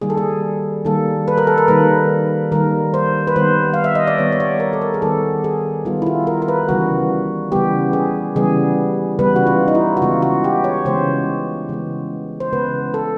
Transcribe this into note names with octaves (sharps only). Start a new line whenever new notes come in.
D#3 G3 A#3 G#4
A4
G#4
D#3 G3 A#3 A4
B4
A#4
A4
A#4
D#3 G3 A#3 B4
D#3 G3 A#3 A#4
C5
B4
D#3 G3 B3 C5
F5
E5
D#5
D5
D#3 G3 B3 C#5
C#5
D5
A#4
A4
A#4
G#4
D#3 G3 B3 A4
G#4
D#3 G3 B3 F4
E4
F4
A#4
A#4
B4
C#3 E3 G3 B3 F#4
C#3 E3 G3 B3 G4
G#4
C#3 E3 G3 B3 G#4
C#3 E3 G3 B3 B4
F#4
F4
D#4
E4
F#4
C#3 E3 G#3 B3 F4
F#4
G4
C#5
C#3 E3 G#3 B3 C5
C#3 E3 G#3 B3
C5
C#3 E3 G#3 B3 B4
A4